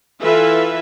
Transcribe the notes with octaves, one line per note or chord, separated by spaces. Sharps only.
E3 F4 A4 B4 E5